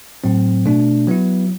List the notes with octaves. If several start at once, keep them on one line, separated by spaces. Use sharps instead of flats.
A2 F#3 C4
B2 A3 D4
F#3 B3 E4